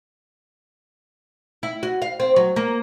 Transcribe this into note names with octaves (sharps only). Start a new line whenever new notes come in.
E4
F#4
F5
C4
F#3
A#3